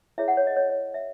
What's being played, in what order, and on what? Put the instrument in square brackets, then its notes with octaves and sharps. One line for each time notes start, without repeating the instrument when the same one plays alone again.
[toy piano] E4 G#4 C#5 E5
F#5
C#5
D#5
C#5
C#5
E5